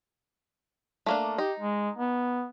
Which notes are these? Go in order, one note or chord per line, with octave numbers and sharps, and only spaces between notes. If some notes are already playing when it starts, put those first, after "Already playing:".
A3 A#3 D4
D#4 G4
G#3
B3